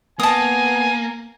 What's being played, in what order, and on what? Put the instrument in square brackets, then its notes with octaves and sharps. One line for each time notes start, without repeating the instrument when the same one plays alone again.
[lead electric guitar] A#3 [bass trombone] B3 [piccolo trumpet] G#5 [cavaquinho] A5 D#6